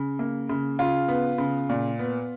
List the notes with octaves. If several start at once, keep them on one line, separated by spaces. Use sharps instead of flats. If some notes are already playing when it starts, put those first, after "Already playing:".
Already playing: C#3
A#3
C#3
C#3 F4
B3
C#3
A#2
B3